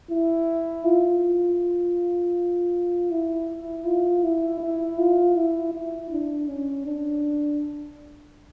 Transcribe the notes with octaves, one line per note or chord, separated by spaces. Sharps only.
E4
F4
E4
F4
E4
E4
F4
E4
E4
D4
C#4
D4